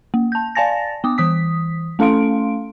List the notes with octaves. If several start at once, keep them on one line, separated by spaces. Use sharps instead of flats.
A#3
A5 G6
D5 F5 G#5 A5 A6 A#6
B3 D6 D#6
E3 D#6 B6
A3 C#4 A4 F5 C6 D7